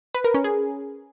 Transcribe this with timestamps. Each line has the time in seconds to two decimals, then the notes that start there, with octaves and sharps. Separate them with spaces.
0.14 B4
0.24 A#4
0.34 C#4
0.44 G#4